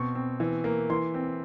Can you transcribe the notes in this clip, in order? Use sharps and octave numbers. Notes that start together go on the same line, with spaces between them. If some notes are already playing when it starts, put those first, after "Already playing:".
Already playing: B2 C4 C#6
C4
E3
A#3
E3 C6
C4